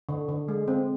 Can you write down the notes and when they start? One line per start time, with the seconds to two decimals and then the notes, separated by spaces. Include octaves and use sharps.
0.09 D3
0.28 D3
0.48 G#3
0.68 C4